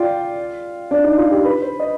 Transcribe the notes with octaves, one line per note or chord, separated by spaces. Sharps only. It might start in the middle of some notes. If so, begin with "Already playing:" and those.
Already playing: F4 D5 G5
D4
D#4
F4
G4
B4
C5
D#5